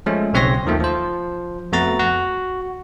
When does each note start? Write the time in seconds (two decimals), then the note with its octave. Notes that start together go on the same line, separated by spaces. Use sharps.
0.06 F3 G#3 A3 C#4
0.33 B1 C#3 C4 C#5 C6 A#6
0.65 D#2 D#3 F3 A3
0.80 F3 C5
1.72 F2 A3 B3 F#4 A#5 A6
1.99 F#4